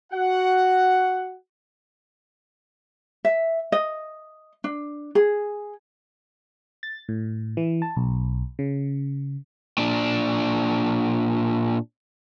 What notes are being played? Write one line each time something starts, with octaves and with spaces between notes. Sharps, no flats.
F#4 F#5
E5
D#5
D4
G#4
A6
A2
E3
A5
B1
C#3
A#2 D4